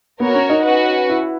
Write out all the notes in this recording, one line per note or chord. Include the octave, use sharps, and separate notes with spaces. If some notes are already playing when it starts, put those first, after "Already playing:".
B3 F#4 A#4 C#5
C#4
D#4
C#4 F#4 B4 F#5
E4